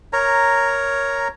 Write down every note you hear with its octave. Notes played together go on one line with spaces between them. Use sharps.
A#4 C#5 A#5